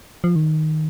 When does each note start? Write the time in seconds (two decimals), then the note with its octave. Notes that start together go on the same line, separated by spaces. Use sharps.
0.24 F3
0.36 D#3